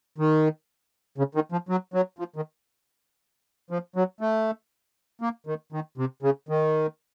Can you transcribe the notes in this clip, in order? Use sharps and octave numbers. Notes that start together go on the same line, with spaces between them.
D#3
C#3
D#3
F3
F#3
F#3
F3
D#3
F3
F#3
A3
A#3
D#3
D#3
C3
C#3
D#3